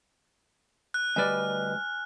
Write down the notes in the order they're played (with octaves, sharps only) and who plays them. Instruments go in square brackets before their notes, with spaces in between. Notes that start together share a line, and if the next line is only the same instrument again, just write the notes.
[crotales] F#6
[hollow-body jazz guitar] D2 G3 D5 [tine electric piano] B4 D#5 [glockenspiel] G#5 F6